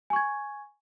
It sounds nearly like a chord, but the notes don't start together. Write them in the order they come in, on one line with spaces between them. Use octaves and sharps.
G#5 C#6 G#6